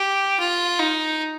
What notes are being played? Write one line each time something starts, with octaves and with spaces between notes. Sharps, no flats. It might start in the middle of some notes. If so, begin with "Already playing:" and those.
Already playing: G4
F4
D#4